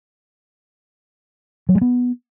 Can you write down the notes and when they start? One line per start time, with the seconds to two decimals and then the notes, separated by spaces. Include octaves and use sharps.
1.69 F#3
1.75 G#3
1.81 B3